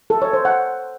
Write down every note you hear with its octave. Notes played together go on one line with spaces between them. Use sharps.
A4
C#5
C5
F#5